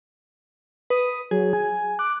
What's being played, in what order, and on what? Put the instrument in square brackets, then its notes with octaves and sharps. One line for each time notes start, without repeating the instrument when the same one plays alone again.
[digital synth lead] B4 [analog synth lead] D#6
[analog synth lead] F#3 [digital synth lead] G#4
[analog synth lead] G#5
[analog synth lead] D6 [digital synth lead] F#6